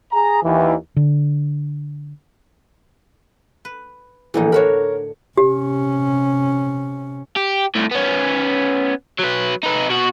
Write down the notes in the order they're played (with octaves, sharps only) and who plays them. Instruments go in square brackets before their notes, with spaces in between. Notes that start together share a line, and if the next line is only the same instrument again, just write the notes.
[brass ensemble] G#4 A#5
D#2 E3
[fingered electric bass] D3
[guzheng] B4
[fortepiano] A#1 E3 [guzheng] A2 D3 D#4
[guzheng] D4 F#4 B5 [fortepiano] A#4 C#5
[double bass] C3 C#4 [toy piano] G4
[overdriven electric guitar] G4
C2 A2
B3 C#4
F#3 B4
D#4 B4
B2 F#4